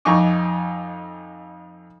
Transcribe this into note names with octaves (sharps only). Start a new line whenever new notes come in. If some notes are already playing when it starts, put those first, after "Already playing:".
F2 D#4 G#5 C#6 D6